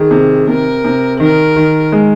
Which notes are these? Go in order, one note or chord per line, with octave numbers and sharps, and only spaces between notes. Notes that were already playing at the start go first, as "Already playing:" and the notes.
Already playing: D#3 G#4
C3
C3 A#4
C3
D#3 A#4
D#3
G#3